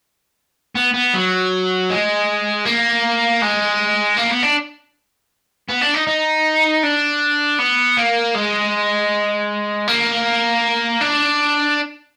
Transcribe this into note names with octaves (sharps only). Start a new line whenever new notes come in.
B3
B3
F#3
G#3
A#3
G#3
A#3
B3
D4
B3
D4
D#4
D#4
D4
B3
A#3
G#3
A#3
D4